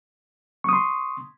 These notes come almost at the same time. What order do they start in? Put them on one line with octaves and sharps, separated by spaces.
C#6 D#6 C6